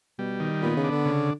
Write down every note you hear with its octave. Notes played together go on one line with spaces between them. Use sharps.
B2 G3
D#3
A#2 B3
C#3
D4
D3
C#3